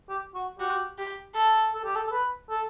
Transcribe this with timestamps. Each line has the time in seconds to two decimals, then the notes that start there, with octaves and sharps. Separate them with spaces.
0.09 G4
0.35 F#4
0.59 F#4 G4
0.98 G4
1.35 A4
1.74 A4
1.84 G4
1.96 A4
2.07 A4
2.11 B4
2.50 A4